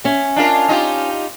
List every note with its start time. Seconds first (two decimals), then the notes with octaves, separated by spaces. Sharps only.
0.04 C#4 E5
0.36 D4 F4 A#4
0.69 D#4 F4 G4